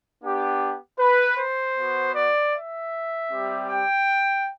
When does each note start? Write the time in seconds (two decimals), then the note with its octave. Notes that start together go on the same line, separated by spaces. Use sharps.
0.23 B3 D4 G4
1.00 B4
1.38 C5
1.77 B3 F#4
2.15 D5
2.54 E5
3.31 G3 C4 G4
3.70 G5